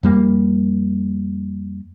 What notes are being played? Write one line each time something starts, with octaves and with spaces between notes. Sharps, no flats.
F2 G3 A#3